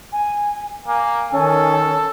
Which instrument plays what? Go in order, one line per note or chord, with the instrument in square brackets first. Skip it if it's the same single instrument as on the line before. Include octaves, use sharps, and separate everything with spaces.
[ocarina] G#5
[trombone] A#3 [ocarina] G#5
[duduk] D#3 [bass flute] C#4 [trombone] A4